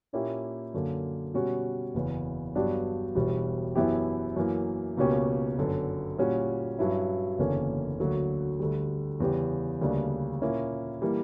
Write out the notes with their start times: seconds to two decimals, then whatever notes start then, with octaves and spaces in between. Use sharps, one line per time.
0.13 A#2 A#3 C#4 E4 G4
0.74 F#2 D3 A#3
1.34 B2 G3 C#4 F#4
1.94 F#1 E2 C#3
2.55 G2 F#3 B3 D4 G4
3.15 E1 E2 B2 G3
3.75 F#2 E3 B3 E4 G4
4.36 F#2 E3 A#3
4.97 C#2 B2 A#3 C#4 G4
5.58 G1 F#2 D3
6.18 A#2 G3 C#4 F#4
6.78 G2 F#3 C#4 E4
7.38 F#1 E2 D3 A#3 C#4
8.00 D2 D3 F#3 A#3
8.59 D2 D3 G3
9.20 E2 C#3 G3 C#4 G4
9.81 D2 C#3 G3 A#3 D4
10.42 A#2 A#3 C#4 E4
11.02 E3 G3 A#3